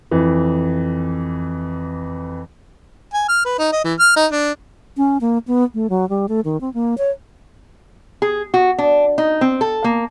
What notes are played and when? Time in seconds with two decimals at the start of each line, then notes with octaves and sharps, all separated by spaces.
0.11 F2 E3
3.13 G#5
3.28 F6
3.45 B4
3.58 D#4
3.72 D#5
3.84 E3
3.99 F6
4.16 D#4
4.31 D4
4.97 C#4
5.21 A#3
5.48 B3
5.74 A3
5.90 F#3
6.09 G3
6.29 A3
6.45 D#3
6.61 C4
6.74 A#3
6.98 C#5
8.22 G#4
8.54 F#4
8.78 D4
9.18 D#4
9.41 C4
9.61 A4
9.84 A#3